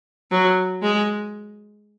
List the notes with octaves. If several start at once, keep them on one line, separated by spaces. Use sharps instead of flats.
F#3
G#3